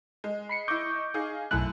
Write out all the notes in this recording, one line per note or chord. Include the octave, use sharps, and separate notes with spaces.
G#3
B5 C7 C#7
E4 D#5 C#6 D6 G6
D#4 G#4 F5
B1 F#2 A3 E4 F#6